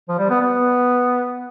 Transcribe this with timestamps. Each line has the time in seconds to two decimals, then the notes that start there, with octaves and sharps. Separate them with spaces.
0.09 F3
0.19 G3
0.30 B3
0.41 B3